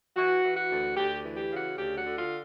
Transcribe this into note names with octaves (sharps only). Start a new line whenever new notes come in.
E3 F#4
E3
F#4
D2
D2 G4
E3
G4
C#3
F#4
D2 G4
F#4
D3
F4